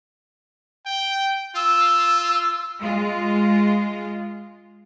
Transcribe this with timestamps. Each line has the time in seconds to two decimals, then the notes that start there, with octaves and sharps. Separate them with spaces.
0.86 G5
1.56 F4 E6
2.81 G#3 F4